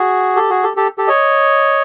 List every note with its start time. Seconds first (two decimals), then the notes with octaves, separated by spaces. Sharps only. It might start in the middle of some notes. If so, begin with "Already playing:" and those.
Already playing: F#4 G#4
0.36 G4 A4
0.50 F#4 G#4
0.63 G4 A4
0.77 G4 A4
0.98 G4 A4
1.08 C#5 D#5